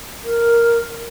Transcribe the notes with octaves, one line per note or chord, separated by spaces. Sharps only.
A#4